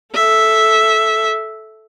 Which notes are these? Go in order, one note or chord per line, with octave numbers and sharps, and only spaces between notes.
A4 E5